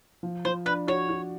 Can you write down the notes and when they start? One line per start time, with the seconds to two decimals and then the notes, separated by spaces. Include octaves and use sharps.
0.23 F3
0.45 F3 C5
0.66 D4 B4
0.88 F#4 C#5
1.09 F#4